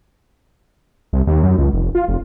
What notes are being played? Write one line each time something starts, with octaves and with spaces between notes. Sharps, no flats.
C2
D#2
F#2
C#2
F1
F4
F1